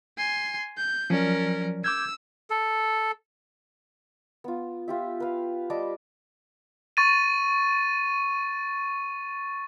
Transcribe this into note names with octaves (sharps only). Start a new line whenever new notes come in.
G#5 C6
G6
F3 F#3 C#4 A#4 D5
D6 E6 G6 G#6
A4
B3 F4
F4 G4 E5
B4 F5
G3 D#5 A5 D6
C#6 A6 D#7